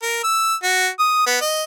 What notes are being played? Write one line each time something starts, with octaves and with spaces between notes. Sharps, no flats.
A#4
E6
F#4
D#6
B3
D#5